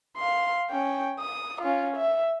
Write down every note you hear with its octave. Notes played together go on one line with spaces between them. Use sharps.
F5 C6
C#4 G5
D#6
C#4 F4
E5